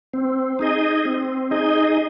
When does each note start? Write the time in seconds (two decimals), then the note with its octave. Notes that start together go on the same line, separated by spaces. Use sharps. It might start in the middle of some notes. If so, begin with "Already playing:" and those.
0.14 C4
0.59 D#4 G#4 D#5
1.05 C4
1.51 D#4 G#4 D#5